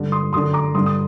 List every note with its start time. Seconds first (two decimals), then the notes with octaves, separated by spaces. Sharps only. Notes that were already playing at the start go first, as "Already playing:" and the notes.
Already playing: G2 D3
0.12 C6 D#6
0.33 F#2 D3 C6 D#6
0.53 A#5 D6
0.74 G2 D3 C6 D#6
0.86 D#6